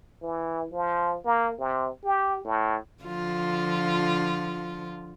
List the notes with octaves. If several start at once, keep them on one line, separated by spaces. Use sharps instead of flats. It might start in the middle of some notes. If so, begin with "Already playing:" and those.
E3
F3
A#3
C3
G4
A2
D3 F3 F4